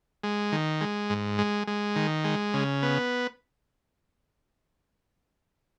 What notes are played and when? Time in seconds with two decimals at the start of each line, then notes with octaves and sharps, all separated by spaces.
0.23 G#3
0.52 D#3
0.81 G#3
1.10 G#2
1.38 G#3
1.67 G#3
1.96 D#3
2.24 G#3
2.54 C#3
2.83 B3